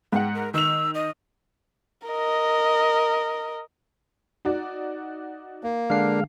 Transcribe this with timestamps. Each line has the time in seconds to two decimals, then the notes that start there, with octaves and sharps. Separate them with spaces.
0.12 G#2 F#5 G5
0.35 A#4
0.54 D#3 E6 F7
0.94 D#5
2.07 A#4 D#5
4.45 D#4 F#4 D5
5.63 A#3
5.90 D3 G#3 D4 F5 C7